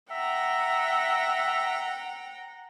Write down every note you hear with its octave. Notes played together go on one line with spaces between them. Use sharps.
E5 F#5 G5 A#5